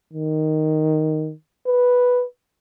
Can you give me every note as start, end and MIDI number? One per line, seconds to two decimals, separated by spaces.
0.13 1.32 51
1.67 2.24 71